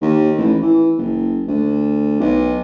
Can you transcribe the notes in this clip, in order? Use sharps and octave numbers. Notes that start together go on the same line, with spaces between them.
D#2
A1
E3
F#1
D2
B1